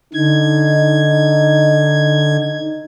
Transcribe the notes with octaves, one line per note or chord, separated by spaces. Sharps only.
D3 D#4 G#6